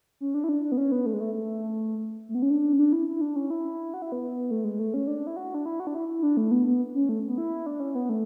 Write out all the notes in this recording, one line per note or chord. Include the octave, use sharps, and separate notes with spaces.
C#4
D4
E4
D4
D4
B3
C#4
B3
A3
G#3
A3
A3
A3
B3
C#4
D4
C#4
D4
E4
E4
D4
C#4
E4
F#4
E4
B3
A3
G#3
A3
C#4
D4
E4
F#4
D4
E4
F#4
D4
E4
E4
D4
A3
B3
B3
C#4
A3
B3
E4
D4
C#4
B3
A3